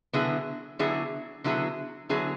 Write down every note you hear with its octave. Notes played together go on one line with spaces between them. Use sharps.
D3 F#3 B3 E4 G#4
D3 F#3 B3 E4 G#4
D3 F#3 B3 E4 G#4
D3 F#3 B3 E4 G#4